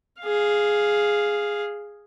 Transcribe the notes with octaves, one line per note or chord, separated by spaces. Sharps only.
G#4 F5